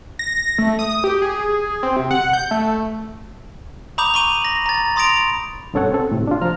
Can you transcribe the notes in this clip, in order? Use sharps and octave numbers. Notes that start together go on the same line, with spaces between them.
A#6
A3
D#6
G4
G#4
C4
C3
F#5
G6
A3
A#5 B5 D6 D#6 G6 F7
B5 C#6 D#7 F7
A#6 F#7
A#5 A6
C6 D#6 A6 A#6 D7 F7
G2 B2 C#4 A4 C#5 F#5
C4 A4
A2 C3
D4 F4
F3 A#5 F6